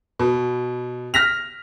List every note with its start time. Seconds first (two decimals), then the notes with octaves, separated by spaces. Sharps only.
0.19 B2
1.14 F6 A#6 B6 F7